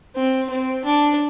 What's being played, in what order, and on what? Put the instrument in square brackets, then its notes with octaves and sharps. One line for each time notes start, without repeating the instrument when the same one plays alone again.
[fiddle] C4
C4
D4